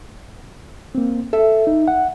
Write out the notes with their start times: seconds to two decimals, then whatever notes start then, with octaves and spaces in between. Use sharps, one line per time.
0.95 A#3 C4
1.33 A4 E5
1.67 D#4
1.88 F#5